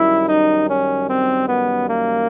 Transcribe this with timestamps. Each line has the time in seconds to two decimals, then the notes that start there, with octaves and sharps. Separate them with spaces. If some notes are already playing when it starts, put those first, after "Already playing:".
Already playing: F#2 D#3 G3 E4
0.28 D#4
0.69 C#4
1.09 C4
1.49 B3
1.89 A#3